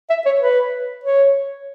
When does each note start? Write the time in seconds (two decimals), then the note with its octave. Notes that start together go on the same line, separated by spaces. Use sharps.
0.10 E5
0.26 C#5
0.41 B4
1.04 C#5